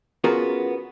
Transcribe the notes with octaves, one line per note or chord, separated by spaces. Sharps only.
B3 C#4 F4 F#4 G#4 A#4